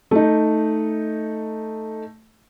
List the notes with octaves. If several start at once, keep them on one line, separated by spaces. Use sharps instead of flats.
A3 D#4